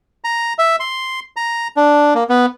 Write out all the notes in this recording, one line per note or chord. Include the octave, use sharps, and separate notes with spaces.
A#5
E5
C6
A#5
D4
A#3
B3